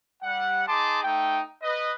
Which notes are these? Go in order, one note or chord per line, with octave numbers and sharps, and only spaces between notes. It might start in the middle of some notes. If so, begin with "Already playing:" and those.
G3 F#5
D#4 G#4 A5 C6 D6
A3 D#4 G5
B4 D#5